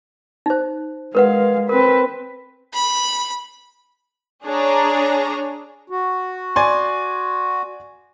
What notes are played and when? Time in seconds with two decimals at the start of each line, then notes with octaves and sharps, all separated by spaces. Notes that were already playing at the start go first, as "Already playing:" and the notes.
0.46 D#4 C5
1.15 G#3 A#4 B4 F5 F#5
1.69 C4 A#4 B4
2.74 B5
4.46 D4 G#4 C#5 A#5
5.90 F#4
6.56 D5 G#5 C6